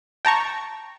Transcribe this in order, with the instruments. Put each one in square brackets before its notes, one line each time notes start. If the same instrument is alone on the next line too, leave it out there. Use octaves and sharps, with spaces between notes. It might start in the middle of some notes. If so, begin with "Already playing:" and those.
[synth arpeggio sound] G5 A5 A#5 C#6